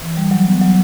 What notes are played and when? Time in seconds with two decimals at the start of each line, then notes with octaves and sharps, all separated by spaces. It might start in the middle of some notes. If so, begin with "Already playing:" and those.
0.02 E3
0.17 G3
0.31 F#3
0.47 B3
0.62 F#3